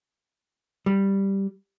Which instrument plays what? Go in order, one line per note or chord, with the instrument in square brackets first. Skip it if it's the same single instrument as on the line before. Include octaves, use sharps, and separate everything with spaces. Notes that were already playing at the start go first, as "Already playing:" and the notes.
[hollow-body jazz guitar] G3